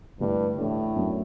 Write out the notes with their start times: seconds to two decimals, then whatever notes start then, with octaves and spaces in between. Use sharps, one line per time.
0.20 G2 D3 A3 E4
0.58 A2 E3 A3 D4
0.96 F#2 F#3 A3 D4